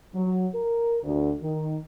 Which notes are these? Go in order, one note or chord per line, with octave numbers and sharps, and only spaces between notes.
F#3
A#4
D2
D#3